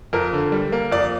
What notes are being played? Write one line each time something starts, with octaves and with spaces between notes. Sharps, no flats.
F2 A#4
D3
G3
A#3
F2 D5